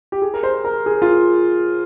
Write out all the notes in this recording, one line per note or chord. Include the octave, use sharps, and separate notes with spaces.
G4
G#4
A#4
C5
A#4
G#4
F4